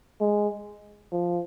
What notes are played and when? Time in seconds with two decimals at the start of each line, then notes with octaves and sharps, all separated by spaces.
0.21 G#3
1.12 F3